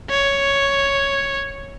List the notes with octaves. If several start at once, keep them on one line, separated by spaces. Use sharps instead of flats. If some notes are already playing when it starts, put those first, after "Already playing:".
C#5